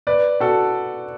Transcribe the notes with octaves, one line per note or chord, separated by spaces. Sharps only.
B4 D5
F#4 A4